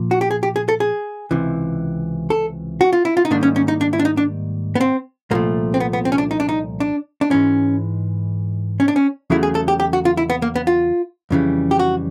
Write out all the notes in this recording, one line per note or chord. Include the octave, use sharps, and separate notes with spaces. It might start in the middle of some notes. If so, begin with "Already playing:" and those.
Already playing: A#2 F3 A#3
F#4
G4
G#4
G4
G#4
A4
G#4
C#2 C3 E3
A4
F#4
F4
E4
F4
D#4
G#2 D#3 G3 A#3 D4
C#4
C#4
D#4
D4
E4
D4
D#4
D4
B3
C4
C2 A#2 F3 A3 A#3
C4
B3
B3
C4
C#4
D4
D#4
D4
D#4
D4
D4
G#2 E3 G#3 C#4
C#4
D4
C#4
E2 C#3 F#3 A3 E4
G#4
A4
G4
G4
F#4
F4
E4
B3
A#3
B3
F4
F2 C#3 E3 G3
G4
F#4